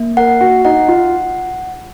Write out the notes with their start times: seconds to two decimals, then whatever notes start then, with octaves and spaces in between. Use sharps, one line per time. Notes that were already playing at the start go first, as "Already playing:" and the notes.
Already playing: A#3
0.17 A#4 F#5
0.41 F#4
0.65 D#4 F#5
0.88 F4